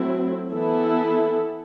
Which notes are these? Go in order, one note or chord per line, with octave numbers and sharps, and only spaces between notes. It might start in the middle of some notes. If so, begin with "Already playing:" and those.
Already playing: F#3 A3 C4 E4
E3 B3 E4 A4